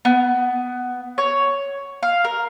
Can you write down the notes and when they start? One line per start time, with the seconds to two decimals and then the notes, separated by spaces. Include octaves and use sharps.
0.05 B3
1.18 C#5
2.03 F5
2.24 A#4